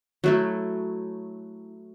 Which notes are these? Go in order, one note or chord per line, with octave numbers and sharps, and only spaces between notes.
F#3 A3 E4